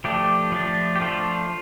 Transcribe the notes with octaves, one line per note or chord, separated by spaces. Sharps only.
F3 A3 D4 G4
F3 A3 D4
G4
F3 A3 D4 F4